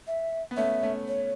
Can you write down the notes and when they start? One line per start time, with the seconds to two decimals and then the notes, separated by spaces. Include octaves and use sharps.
0.08 E5
0.51 B3
0.57 A3 C#4 E5
0.82 A3 C#4
1.08 C#5